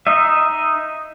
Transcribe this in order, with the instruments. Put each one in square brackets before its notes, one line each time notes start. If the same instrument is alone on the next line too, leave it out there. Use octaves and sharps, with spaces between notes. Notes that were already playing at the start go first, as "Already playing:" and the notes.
[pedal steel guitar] D#4 D#5 E5